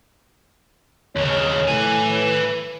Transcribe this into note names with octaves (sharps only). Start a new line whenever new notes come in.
D#2 C#3 C#5
A2 B4 G#5